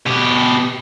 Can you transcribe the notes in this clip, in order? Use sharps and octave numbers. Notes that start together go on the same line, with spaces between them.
B2 G4